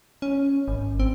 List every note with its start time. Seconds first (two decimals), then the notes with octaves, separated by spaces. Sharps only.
0.22 C#4
0.68 G#1
1.00 C4